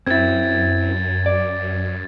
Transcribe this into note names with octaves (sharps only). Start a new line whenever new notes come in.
F#2 C4 E4 G#6 A6
D5